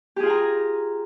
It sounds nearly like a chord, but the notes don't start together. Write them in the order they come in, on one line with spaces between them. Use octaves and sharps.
G4 G#4 F4 G#5 A#5